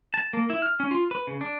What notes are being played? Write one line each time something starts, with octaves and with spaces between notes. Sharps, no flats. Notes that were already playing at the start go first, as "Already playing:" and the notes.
A5
A#3
E4
F6
C#4
F4
B4
C#3
D4